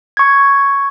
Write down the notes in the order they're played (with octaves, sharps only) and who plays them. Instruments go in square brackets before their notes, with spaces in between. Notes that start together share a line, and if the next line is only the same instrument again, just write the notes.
[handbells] C#6 G#6